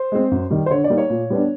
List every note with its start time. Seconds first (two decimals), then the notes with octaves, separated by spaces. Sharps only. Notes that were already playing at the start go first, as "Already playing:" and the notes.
Already playing: C5
0.12 G#3 C4
0.31 F#2
0.50 D#3 G3
0.66 C5
0.71 D3 C#5
0.84 D5
0.90 G3 A#3 D#4
0.98 C#5
1.10 A#2
1.30 G3 B3 D4